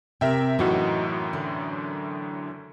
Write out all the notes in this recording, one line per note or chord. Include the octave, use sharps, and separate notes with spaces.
C3 A#4 E5 G5
F#2 A2 E3 D#4 F#4
D3